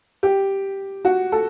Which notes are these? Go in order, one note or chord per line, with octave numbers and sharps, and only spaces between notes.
G4
F#4
A4